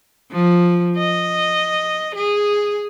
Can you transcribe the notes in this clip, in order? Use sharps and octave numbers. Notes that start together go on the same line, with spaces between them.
F3
D#5
G#4